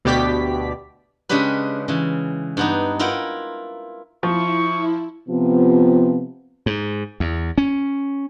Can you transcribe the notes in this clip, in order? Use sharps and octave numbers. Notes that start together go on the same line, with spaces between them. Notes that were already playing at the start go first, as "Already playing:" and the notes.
D2 B2 G4 D5 B6
C#3 G#3 C#4 D4 G4 B4
C#3 E3
G2 B3 D#4
E4 F4 A#4 F#5 G5
F3 E4 C#6
C3 F3 B3
G#2
E2
C#4